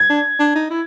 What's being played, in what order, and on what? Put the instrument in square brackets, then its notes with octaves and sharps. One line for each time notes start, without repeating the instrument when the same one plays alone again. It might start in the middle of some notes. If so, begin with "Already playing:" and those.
Already playing: [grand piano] G#6
[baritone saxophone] D4
D4
D#4
E4